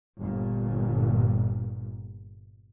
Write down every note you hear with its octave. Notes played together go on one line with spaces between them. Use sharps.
G1 A#2